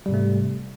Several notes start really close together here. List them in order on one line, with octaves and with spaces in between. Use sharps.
G3 G#2 C3 A3